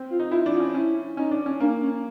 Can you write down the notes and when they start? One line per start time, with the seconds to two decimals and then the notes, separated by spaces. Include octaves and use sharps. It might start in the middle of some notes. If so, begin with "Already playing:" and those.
Already playing: C4
0.10 F4
0.20 D#4
0.31 E4 F4
0.46 D4
0.53 F4
0.60 C#4
0.74 C#4 E4
1.17 C#4 D#4
1.31 D4
1.46 C#4
1.60 A#3 D4
1.81 C#4